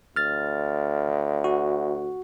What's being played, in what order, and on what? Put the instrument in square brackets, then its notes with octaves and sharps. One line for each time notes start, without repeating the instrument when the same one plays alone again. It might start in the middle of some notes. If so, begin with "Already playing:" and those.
[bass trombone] D2 [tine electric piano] F6 A6
[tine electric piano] F#4